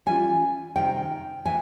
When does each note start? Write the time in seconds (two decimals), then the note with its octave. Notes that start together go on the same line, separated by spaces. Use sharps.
0.06 E3 G3 A#3 C#4 F4 G#5
0.76 C3 D#3 G3 G5
1.45 A2 E3 G#5